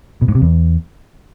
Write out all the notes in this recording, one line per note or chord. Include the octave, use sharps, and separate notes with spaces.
B2
G#2
C3
E2